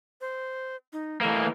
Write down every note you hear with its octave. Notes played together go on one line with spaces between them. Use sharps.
C5
D#4
E3 A3 A#3